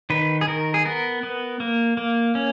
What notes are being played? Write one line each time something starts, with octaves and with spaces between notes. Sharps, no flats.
D#3 B4
G#4
D#3 A#4
G#4
B3 A#4
B3
A#3
A#3
C#4